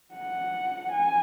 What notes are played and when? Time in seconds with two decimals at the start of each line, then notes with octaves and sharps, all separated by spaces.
0.15 F#5
0.92 G#5